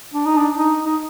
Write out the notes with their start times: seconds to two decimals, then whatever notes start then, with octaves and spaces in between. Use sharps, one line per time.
0.14 D4
0.26 D#4
0.38 D4
0.57 D#4
0.85 D#4